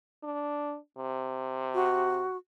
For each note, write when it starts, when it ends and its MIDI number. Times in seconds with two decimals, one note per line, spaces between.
0.23 0.77 62
0.98 2.26 48
1.74 2.37 66